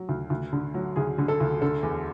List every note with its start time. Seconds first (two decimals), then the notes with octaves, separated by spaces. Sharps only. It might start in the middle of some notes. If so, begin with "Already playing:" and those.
Already playing: F#3
0.09 D2
0.30 D2
0.53 D3
0.74 F#3
0.96 D2 G#4
1.18 D3
1.28 A4
1.40 D2
1.62 D3 A4
1.83 E2